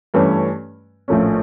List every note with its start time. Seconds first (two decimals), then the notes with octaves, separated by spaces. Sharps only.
0.14 G2 E3 A3 C#4
1.08 A#1 A2 F3 A3 C#4